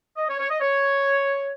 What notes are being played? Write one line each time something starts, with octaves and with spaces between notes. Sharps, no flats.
D#5
C#5
C#5
D#5
C#5